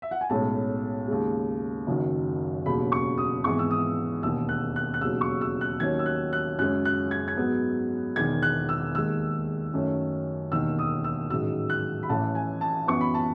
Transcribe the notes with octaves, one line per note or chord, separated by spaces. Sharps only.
E5
F#5
G#5
B1 A2 G#3 C#4 A5
D#2 C#3 G#3
F#1 F#2 D#3 F#3
E1 D#2 C#3 F#3 B5
C#6
D#6
G#1 G#2 E3 B3 C#6
E6
D#6
E1 D#2 D#3 E6
F#6
F#6
F#6
E1 D#2 C#3 F#3 E6
C#6
E6
F#6
D#2 D#3 F#3 C#4 G#6
E6
F#6
F#6
F#2 C#3 G#3 C#4 F#6
F#6
G#6
G#6
G#2 F#3 B3
E1 E2 D#3 G#6
F#6
E6
D#2 D#3 G#3 E6
F#2 D#3 A3 C#4
E1 D#2 D#3 E6
D#6
E6
A1 G#2 D#3 F#3 E6
F#6
B5
A1 A2 E3 A5
G#5
A5
F#2 E3 B3 C#6
B5
A5